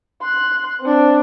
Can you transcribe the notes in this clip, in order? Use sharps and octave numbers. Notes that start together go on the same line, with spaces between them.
C6 F#6
C4 D4